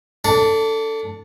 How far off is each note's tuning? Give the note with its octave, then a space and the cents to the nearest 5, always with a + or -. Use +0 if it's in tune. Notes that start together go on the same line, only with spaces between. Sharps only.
D4 -25 A4 +15